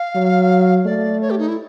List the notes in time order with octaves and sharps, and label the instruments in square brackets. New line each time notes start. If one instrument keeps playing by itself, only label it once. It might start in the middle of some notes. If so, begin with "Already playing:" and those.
Already playing: [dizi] F5
[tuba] F#3
[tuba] A3 [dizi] D5
[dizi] C#5
G4
D#4
E4